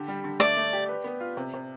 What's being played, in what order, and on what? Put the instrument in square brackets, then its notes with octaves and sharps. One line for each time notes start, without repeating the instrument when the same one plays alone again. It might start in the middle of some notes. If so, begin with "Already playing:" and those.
Already playing: [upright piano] D3 G4
G3
D3
[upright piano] A3 [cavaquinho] D5
[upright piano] A3
G4
B4
B3
F4
C3
C3